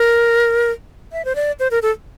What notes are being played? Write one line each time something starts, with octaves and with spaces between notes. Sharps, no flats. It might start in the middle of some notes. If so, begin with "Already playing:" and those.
Already playing: A#4
E5
C5
D5
C5
A#4
A4